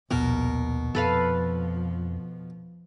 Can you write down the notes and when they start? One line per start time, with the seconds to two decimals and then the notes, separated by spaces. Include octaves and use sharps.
0.11 A#1 D#2 B2 A#4
0.95 F2 F3 A4 B4 F5